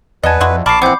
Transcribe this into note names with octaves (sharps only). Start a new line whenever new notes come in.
E2 B4 D5 D#5 F#5 G#5 A5
F2 G#3 E4 F#4
A#1 A#4 A5 B5 C#6 D6 C7
E3 B3 C4 F#5 D6 G6